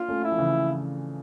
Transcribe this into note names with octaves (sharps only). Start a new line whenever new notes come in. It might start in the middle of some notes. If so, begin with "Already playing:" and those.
Already playing: A#3 D4 F4
A3 C#4
E4
F3
C#3 E3